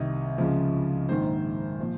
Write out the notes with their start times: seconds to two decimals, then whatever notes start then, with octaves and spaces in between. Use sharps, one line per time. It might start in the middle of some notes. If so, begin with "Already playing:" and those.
Already playing: C2 C3 D#3 D#5
0.38 C#2 C#3 F3
1.09 A#1 G#2 D#3 C5
1.80 A#2 F3